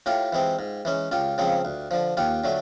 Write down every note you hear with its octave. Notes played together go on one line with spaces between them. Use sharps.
A2 F4 G4
E3 G#3 C4
G#2
E3 G#3 C#4
C#2 F4 G4
C#3 F3 G#3 C4
D2
D3 F3
D#2 F4 G4
D3 F#3 A3